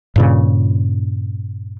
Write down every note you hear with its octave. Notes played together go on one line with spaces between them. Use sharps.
G2 A#2 C#3